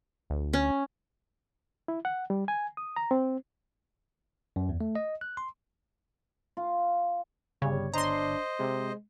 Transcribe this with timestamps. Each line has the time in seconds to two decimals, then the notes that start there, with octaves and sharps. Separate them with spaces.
0.30 D2
0.53 C#4
1.88 E4
2.05 F#5
2.30 G3
2.48 G#5
2.77 D#6
2.96 A#5
3.11 C4
4.56 F#2
4.69 E2
4.81 A3
4.95 D#5
5.21 F#6
5.37 C6
6.57 F4
7.62 G1 C#3 G3 C#5
7.94 D4 C5 D#5 A#5 C6
8.60 C3 G#3